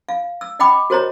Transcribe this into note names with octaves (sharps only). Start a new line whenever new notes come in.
F5
E6
D#5 F#5 G5 B5 D6
F#4 A#4 C5 C#5 D#5 A#5